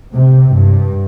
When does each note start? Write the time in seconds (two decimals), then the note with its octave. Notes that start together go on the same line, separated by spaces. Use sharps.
0.14 C3
0.53 G2